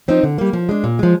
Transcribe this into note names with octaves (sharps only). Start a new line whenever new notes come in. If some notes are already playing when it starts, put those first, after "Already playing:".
F3 C4 D#4
D3
G3 A#3
F3
G#3 D4
A#2
F3 G#3